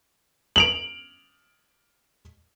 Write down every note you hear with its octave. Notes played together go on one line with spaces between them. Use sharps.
D7 F7 F#7